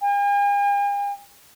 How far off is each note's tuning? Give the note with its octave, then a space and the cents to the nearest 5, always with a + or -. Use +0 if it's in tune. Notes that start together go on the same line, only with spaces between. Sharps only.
G#5 -45